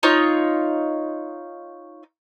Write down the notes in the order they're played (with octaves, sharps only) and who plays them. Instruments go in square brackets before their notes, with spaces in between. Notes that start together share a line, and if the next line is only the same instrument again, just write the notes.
[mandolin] D#4 F4 C#5